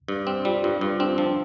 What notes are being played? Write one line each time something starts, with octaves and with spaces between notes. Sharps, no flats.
G2
C4
G3 F4
G2 F4
G2 F4
C4 D4
F3 D4